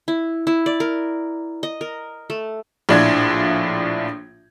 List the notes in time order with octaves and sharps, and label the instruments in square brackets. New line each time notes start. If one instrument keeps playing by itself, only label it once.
[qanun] E4
E4
D5
A#4
D#5
A#4
A3
[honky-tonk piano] A#1 A2 D4 E4 F4 G#6